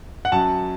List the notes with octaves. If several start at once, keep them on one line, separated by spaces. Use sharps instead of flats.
F#5
F#2 A5